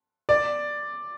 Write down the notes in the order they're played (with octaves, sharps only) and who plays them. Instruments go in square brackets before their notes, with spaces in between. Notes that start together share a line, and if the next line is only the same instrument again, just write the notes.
[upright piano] D5